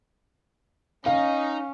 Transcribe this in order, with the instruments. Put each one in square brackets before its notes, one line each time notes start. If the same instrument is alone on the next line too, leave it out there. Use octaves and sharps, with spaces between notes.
[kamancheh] C#4 [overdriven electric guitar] D#4 [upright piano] F5